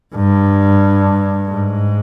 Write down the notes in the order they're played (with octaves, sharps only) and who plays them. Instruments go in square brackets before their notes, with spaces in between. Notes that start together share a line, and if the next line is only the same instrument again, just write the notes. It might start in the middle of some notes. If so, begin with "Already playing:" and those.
[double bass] G2
G#2